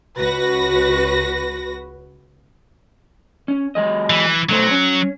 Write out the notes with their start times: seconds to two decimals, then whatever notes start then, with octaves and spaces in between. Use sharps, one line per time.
0.16 C#2 F#4 B4 A#6
3.48 C#4
3.75 F#3 G#3 D#5
4.10 E3
4.49 B1 F#3 A3 C5
4.71 C#4